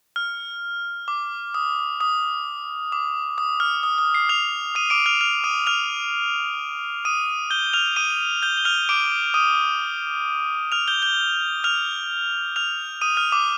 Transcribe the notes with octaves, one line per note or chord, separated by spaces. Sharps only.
F6
D6
D#6
D#6
D6
D#6
F6
D#6
D#6
C7
F6 F7
D#6 D#7
D6 D7
F6 F7
F6 F7
D#6 D#7
F6 F7
D#6 D#7
G6 G7
F6 F7
D#6 D#7
G6 G7
G7
F6 F7
D6 D7
D#6 D#7
F6 F7
G6 G7
G6 G7
F6 F7
F6 F7
D#6 D#7
F6
D6